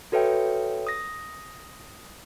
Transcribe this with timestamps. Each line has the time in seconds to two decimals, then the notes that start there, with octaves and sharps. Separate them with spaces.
0.12 F#4 A4 B4 C#5 E5 G5
0.87 D#6 A#6